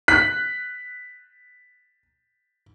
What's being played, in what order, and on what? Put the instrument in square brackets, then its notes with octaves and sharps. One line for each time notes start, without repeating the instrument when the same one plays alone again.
[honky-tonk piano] F#6 [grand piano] B6